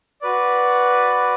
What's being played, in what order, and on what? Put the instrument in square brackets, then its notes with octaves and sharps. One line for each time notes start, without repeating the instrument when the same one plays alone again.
[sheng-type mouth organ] F#4 B4 D5